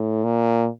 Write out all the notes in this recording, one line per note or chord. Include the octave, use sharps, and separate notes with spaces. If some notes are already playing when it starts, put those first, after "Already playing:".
Already playing: A2
A#2